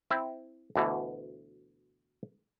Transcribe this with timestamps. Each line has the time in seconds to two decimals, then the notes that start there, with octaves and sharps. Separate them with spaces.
0.10 C4 E4
0.76 D2 B2 D3 E3